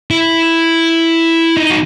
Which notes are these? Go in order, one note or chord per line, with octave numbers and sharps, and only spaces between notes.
E4
D#4
F#4